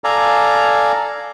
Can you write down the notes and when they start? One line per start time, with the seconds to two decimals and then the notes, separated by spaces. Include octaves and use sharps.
0.04 A4 D5 F5 G#5 A#5